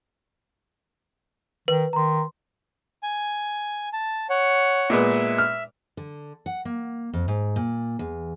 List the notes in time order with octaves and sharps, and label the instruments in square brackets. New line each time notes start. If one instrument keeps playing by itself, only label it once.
[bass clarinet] D#3 [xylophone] B4
[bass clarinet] D#3 [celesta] A#5 C6
[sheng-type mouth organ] G#5
A5
C#5 F#5
[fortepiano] A#2 G#3 B3 [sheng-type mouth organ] E5
[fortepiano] F6
[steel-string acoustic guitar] D3
F#5
A#3
F2
G#2
A#2
E2